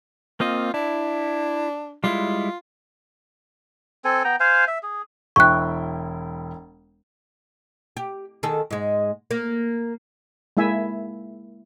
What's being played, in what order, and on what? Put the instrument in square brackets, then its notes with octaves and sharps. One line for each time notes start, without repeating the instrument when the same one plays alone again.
[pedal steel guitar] A#3 C4 D#5 [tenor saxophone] F4
[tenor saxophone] D4 [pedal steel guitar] E4
[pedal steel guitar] G3 G#3 E4 [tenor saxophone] F4
[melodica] C4 A4 G#5
B3 G5 A#5
C5 F5 G#5
E5
G#4
[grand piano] E1 E4 G5 [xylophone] C#6 F#6
[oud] G4
D#3 G#4 A4
G#2 G#3
A#3
[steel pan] G#3 A#3 E4 E5 G#5